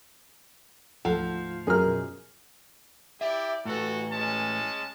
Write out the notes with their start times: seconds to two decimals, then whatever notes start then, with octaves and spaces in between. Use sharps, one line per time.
1.05 D2 G#2 F3 A4 F#5
1.67 F#2 G#4 A#4 A#5 F6
1.84 B2
3.21 E4 G4 D5 E5
3.65 A2 F#4 A4 B4
4.12 G#3 C#4 A5